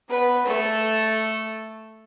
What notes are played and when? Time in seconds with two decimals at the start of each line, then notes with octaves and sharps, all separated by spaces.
0.10 B3 B4
0.46 A3 A4